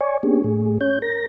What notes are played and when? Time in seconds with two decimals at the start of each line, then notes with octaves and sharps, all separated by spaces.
0.01 C#5 D5 G#5 C#6
0.23 A#3 B3 C#4 D4 G4 G#4
0.44 A2 A3 G#4
0.81 C#4 C#5 G6
1.02 A#4 A#6